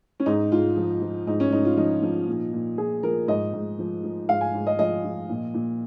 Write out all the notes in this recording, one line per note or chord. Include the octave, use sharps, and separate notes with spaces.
C#4
G#2 D#4
G#2 F4
F3
F3
G#2 D#4
C#4
G#2 D#4
F4
F3 D#4
F3
A#2
A#2
F3 G#4
F3 A#4
G#2 D#5
G#2
F3
F3
G#2 F5
G#5
G#2
D#5
F3 D#5
F3
A#2
A#2